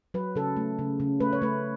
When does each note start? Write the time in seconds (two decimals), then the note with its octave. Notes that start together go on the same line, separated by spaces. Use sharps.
0.14 F#3 B4
0.36 C#3 A4
0.57 A3
0.79 C#3
1.00 C#3
1.20 A3 B4
1.33 C#5
1.42 A3 B4